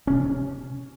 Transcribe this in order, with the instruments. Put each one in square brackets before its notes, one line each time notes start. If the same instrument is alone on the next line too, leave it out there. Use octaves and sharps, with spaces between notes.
[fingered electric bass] C3 C#4